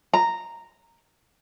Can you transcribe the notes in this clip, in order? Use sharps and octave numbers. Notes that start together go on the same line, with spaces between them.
A#5